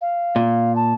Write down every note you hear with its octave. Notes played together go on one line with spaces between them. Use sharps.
F5
A#2
A5